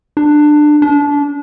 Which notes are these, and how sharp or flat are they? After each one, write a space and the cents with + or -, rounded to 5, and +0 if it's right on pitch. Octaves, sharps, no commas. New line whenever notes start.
D4 +20
D4 -25